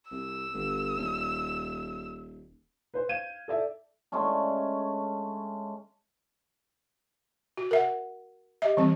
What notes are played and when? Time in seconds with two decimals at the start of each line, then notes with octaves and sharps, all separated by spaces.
0.11 C2 E6
0.54 G1
0.98 D#1
2.94 B4 C5
3.09 F5 G6 G#6 D#7 E7
3.48 A4 D5 E5
4.12 G#3 A3 C#4 D4
7.57 F#4
7.71 A#4 E5 F#5
8.62 G4 D#5 E5
8.77 E3 G3 C4